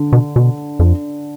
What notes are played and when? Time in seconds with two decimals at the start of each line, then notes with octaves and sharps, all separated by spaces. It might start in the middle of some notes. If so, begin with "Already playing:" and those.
Already playing: D3
0.13 B2
0.36 B2
0.79 F2